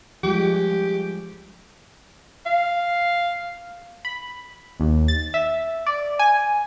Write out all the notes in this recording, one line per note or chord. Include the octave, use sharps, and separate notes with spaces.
F3 G3 G#3 G4
F5
B5
D#2
A6
E5
D5
G#5